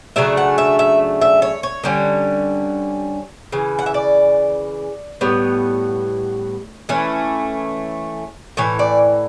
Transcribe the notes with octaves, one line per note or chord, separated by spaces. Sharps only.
C#3 F#3 A3 D4 E5
F#5
E5
E5
E5
C#5
C#5
D3 G3 C#4
C#3 E3
F#5
E5
D5
A2 G3 B3 C#5
E3 A3 C#4
A2 E3 C#5
D5